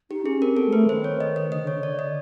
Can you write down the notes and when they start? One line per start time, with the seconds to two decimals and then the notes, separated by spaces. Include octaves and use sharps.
0.10 D#4 G4
0.25 C#4 G#4
0.42 C4 A#4
0.57 B3 A4
0.68 G#3
0.72 A3 B4
0.89 D#3 C5
1.04 C#5
1.20 D#5
1.36 D#5
1.51 D3 D#5
1.61 D3
1.67 C#5
1.73 D3
1.83 D3 D5
1.99 D#5